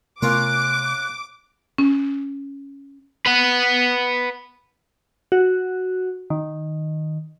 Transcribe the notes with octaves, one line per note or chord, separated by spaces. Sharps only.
C3 A3 B3 C#4 F4 A#4 D6 F#6
C#4
B4 F#5
F#4
D#3